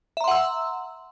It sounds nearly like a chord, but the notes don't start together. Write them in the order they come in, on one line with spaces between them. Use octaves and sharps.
E5 A#5 C6 F#5 E6